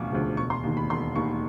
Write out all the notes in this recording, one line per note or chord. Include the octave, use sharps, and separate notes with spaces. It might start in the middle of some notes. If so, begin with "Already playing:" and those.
Already playing: E1 D2 C#3 F3 C#6 D6
D2 C#3 F3
E1 C#6
C6
D#2 D#3
B5
E1 C6
D#2 D#3 C#6